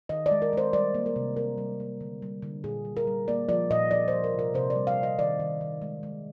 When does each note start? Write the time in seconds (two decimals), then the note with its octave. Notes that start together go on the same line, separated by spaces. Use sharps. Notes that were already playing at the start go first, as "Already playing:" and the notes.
0.09 D#3 D#5
0.26 D5
0.31 G#3
0.42 A#4
0.53 G#3 C5
0.73 G3 D5
0.94 A#3
1.06 A#4
1.16 C3
1.36 G3 A#4
1.58 G3
1.80 A#3
2.01 D3
2.22 G3
2.42 D3
2.64 A#2 G#4
2.85 G3
2.97 A#4
3.07 G3
3.28 A#3 D5
3.49 F3 D5
3.71 A#2 D#5
3.91 F3 D5
4.08 F3 C5
4.24 A#4
4.34 C3
4.39 A#4
4.54 C3 C5
4.70 D5
4.76 G3
4.87 F5
4.98 C3
5.03 D#5
5.18 D#3 D5
5.40 D#3
5.61 D#3
5.82 G#3
6.03 G#3